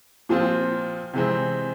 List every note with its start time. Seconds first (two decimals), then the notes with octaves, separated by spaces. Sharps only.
0.29 A#2 F3 C4 F4
1.14 C3 E3 G#3 C4